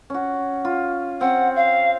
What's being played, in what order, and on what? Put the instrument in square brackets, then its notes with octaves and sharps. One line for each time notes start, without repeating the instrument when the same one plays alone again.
[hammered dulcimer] C#4 F#4
F4
[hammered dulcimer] C4 [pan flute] F#5
[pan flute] F5